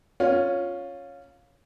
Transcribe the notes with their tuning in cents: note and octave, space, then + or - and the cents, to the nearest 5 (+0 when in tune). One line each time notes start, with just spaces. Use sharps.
C#4 +0 F4 +15